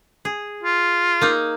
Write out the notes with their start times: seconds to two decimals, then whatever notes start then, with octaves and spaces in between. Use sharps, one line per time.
0.25 G#4
0.63 F4
1.21 A#3 D#4